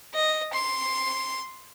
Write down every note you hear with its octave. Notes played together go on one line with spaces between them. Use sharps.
D#5
C6